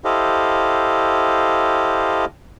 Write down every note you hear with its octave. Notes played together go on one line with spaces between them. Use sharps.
E4 G4 A4 C5 D#5 F5